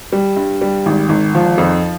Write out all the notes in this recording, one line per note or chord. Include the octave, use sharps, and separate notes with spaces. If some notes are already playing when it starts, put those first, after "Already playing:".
G3
G2
G3
G#1
G#1
F3
F2